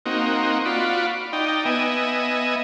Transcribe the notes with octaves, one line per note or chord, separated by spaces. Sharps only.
A#3 C4 D#4 F#4
F4 F#4 D5 B5
D#4 D5 G5
B3 D#5 E5 G#5